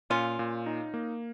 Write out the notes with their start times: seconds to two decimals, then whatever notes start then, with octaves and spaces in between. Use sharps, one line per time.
0.10 A#2 C#4 F4
0.39 A#2
0.66 D#4
0.94 A#3